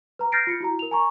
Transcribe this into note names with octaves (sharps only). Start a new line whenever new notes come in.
B4 A#5
F6 G6 A6 A#6 C7 D7
F4 C#7
E4 F#4 A#5
A#4 F7
G#5 A#5 C#6